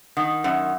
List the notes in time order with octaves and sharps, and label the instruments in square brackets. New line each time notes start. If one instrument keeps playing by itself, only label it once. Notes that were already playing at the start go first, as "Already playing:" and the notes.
[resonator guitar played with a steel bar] D#3 [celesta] F#5
[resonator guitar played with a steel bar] F#2 [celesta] F#5